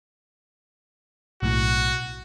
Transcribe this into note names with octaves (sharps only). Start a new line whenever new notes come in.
B1 A2 F#4